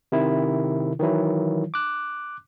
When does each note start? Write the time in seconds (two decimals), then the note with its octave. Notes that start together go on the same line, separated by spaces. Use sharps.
0.12 C3 D#3 E4
1.00 D#3 E3 F#3 E4
1.74 D6 F#6